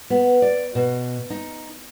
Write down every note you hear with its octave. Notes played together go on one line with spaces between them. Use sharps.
B3
D5
B2
D#4